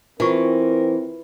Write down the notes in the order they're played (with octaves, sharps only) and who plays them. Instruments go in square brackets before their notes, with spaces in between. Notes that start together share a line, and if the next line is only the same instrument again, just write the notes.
[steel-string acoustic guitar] E3 [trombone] C4 [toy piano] F4 F#4 C#6 [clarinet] A#4